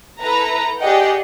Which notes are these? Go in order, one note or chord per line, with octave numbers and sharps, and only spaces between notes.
E4 A4 B4 A#5
G4 G#4 D5 D#5 F#5 G5